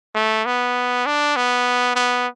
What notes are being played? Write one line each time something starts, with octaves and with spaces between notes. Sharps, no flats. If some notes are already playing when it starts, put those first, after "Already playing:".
A3
B3
D4
B3
B3